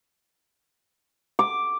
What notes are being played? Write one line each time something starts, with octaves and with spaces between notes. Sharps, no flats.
D6